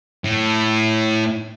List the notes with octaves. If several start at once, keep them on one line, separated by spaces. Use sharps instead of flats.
A2